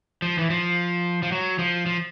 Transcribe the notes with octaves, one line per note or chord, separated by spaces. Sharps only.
F3
E3
F3
F3
F#3
F3
F3